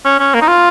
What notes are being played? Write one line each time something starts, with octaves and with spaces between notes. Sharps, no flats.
C#4
C#4
A#3
D#4
F4